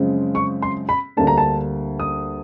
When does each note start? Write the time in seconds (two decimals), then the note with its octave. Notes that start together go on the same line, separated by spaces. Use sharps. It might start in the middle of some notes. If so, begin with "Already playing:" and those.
Already playing: F#2 C#3 F3 G#3 C4
0.35 C#6
0.62 C6
0.89 B5
1.17 D2 D3 G3 A#3 D4 A5
1.27 A#5
1.38 A5
2.00 D#6